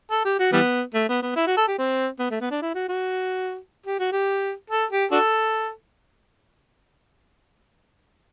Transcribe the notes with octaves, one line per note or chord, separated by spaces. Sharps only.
A4
G4
F#4
E3 G3 B3
A3
B3
B3
E4
F#4
A4
G4
C4
B3
A3
B3
D4
E4
F#4
F#4
G4
F#4
G4
A4
G4
D4 F#4 A4